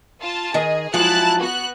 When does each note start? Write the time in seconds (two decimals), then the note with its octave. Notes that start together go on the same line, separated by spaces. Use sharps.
0.21 F4 A5
0.54 D#3 G#4 D#5
0.94 F3 F#3 G#3 E4 A5 F#6
1.39 B3 F#4 F#6